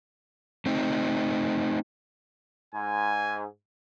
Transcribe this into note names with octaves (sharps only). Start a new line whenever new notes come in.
A3 C4 D#4
G#2 G#5